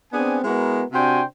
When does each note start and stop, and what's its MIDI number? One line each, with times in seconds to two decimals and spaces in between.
0.13 0.39 59
0.13 0.39 60
0.13 0.39 62
0.13 0.39 68
0.13 0.39 80
0.44 0.82 56
0.44 0.82 59
0.44 0.82 64
0.44 0.82 66
0.44 0.82 70
0.93 1.22 48
0.93 1.22 62
0.93 1.22 66
0.93 1.22 72
0.93 1.22 79
0.93 1.22 80